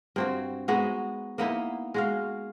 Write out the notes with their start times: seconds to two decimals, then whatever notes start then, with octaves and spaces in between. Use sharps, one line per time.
0.16 G2 C4 F#4
0.68 G#3 B3 D#4 F#4
1.38 A#3 B3 D#4 E4
1.94 G#3 F#4 F5